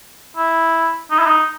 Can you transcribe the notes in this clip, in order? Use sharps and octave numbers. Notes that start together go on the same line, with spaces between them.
E4
D#4
E4
D#4